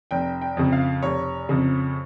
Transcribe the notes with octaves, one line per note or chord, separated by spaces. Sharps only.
F1 G5
G5
F2 C#3
F5
F1 C#5
F2 C#3